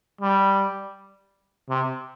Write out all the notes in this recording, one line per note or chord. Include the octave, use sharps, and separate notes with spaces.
G3
C3